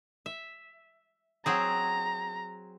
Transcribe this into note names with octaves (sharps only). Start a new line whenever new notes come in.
E5
F#3 C4 G#4 A#5